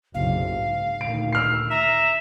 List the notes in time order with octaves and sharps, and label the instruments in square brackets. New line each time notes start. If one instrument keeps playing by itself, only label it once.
[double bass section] F#1 B1 C3 [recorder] F5
[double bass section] G#2
[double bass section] D2 A#2 D#3 [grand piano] D7
[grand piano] E6 F6 C7
[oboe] E5 [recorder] A#5